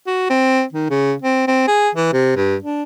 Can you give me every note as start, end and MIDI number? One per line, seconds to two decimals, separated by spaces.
0.07 0.29 66
0.29 0.63 60
0.73 0.87 51
0.90 1.14 49
1.22 1.44 60
1.47 1.65 60
1.68 1.89 68
1.95 2.12 52
2.13 2.33 48
2.36 2.55 43
2.63 2.83 62